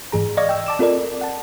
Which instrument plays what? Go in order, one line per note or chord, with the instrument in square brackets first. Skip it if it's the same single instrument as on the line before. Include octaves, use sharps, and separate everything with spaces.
[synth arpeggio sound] G#2 E3 G#4 A#5
D5 D#5 F5 C#6 G#6 A#6
G5 E6
A5 D6 E7
C4 F4 A4 A#4 D5
F#5 A5